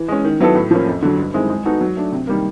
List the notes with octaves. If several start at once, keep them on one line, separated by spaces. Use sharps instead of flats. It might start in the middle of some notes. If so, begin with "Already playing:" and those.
Already playing: E3
G#3 C#4
D#3
F#3 B3 E4 A4
A2
F3 A#3 C#4
F2
D3 F#3
G2
D#3 G#3 C4 E4
G#3
B3 D#4 F#4 A4
F#3
A3 D4
C3
D#3 G3 A#3